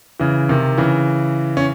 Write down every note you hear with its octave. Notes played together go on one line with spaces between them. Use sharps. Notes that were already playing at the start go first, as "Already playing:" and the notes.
C#3 E3
C3 D#3
C#3 E3
C#4